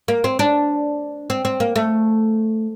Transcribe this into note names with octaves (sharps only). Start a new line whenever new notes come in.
A#3
C4
D4
C4
C4
A#3
A3